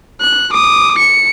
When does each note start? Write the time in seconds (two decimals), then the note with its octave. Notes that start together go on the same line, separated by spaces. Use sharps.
0.21 F#6
0.52 D6 D#6
0.98 C#7